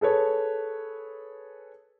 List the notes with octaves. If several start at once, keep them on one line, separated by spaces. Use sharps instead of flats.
G#4 A4 B4 C#5